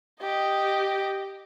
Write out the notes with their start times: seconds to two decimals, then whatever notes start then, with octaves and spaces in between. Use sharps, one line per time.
0.21 G4 D#5